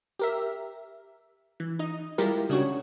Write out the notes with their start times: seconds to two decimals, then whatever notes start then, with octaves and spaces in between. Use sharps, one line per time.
0.19 G4 A#4 E5
1.60 E3
1.79 D#4 D#5
2.18 G3 G#3 E4 F4 G4 A#4
2.49 C#3 D4 F#4 C#5